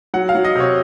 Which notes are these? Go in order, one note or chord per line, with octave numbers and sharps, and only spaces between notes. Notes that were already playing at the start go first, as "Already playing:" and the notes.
F#3 F#5
F5
F#3
D#5
C3 C#5